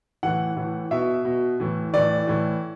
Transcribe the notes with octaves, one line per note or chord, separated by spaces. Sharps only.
A2 E3 F#5
A2 E3
B2 E5
B2
A2 E3
A2 E3 D5
A2 E3